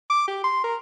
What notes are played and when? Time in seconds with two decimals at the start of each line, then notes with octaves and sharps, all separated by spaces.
0.10 D6
0.27 G4
0.44 C6
0.64 A#4